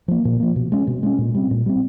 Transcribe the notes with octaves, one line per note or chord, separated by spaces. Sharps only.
F3 A#3
A#2
F3 A#3
B2
G#3 C#4
B2
G#3 C#4
A#2
G3 C4
A#2
G3 C4